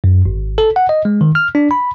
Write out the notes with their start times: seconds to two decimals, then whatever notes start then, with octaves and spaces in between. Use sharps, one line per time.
0.04 F#2
0.26 G#1
0.58 A4
0.76 F#5
0.89 D#5
1.05 G#3
1.21 D#3
1.35 F6
1.55 D4
1.71 B5